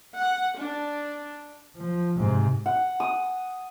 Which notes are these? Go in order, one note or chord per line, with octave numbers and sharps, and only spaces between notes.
F#5
D4
F3
G#2 C3
F#5
D#6